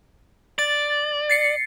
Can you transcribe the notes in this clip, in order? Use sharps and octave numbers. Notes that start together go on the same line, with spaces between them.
D5 A6
A6 C7 C#7